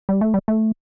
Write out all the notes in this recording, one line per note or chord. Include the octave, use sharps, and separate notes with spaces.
G3
A3
G3
A3